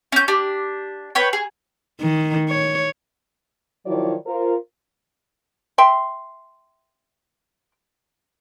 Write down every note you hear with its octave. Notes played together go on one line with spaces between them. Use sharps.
C#4 G6
D4 G4
B4 C#5 G5
G#4
D#3
C#5
D#3 F3 F#3 E4 C#5 D5
F4 A#4 C5
E5 G5 C6